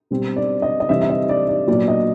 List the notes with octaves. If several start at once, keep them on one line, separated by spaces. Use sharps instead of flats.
B2 G3 C4
D5
D#5
D#5
C3 E3 G3 C4 E5
E5
D#5
D5
D5
A#2 F#3 B3 D5
D#5